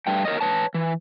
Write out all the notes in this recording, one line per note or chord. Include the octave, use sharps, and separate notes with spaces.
G2 A3 G5
A#4 C#5 D#5
B4 C#5 A5
E3